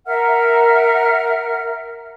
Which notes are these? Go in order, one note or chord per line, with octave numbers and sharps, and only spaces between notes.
A#4 E5 F#5 F6